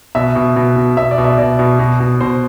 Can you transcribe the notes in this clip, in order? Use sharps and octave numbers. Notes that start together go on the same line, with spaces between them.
B2 E5
B2
B2
B2
B2 E5
D5
B2
E5
B2 D5
B2
B2
B2
B2 C5